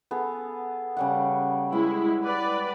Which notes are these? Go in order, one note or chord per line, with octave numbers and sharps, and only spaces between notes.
B3 G#4 A4
C#3 G3 F#5
G#3 B3 E4
B4 D5